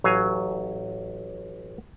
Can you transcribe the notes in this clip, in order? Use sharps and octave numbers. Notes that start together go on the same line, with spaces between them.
A1 F#3 F5 G#5